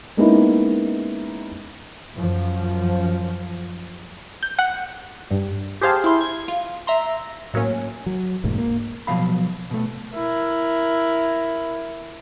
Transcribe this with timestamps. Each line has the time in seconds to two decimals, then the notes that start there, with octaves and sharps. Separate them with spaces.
0.17 G#3 A#3 B3 C#4 D#4 E4
2.14 F#2 F3
4.43 G6
4.58 F#5
5.31 G2
5.81 G4 G#4 C5 F5 A5
6.04 E4 C6
6.21 G#6
6.48 F4
6.87 E5 A#5 C6
7.54 A2 F#3 A#3 C#4
8.06 F#3
8.44 E1 D2 G#2 A#3
8.58 A#3
9.07 B2 F3 F#3 F5 B5
9.71 B2 A3
10.13 E4 A#4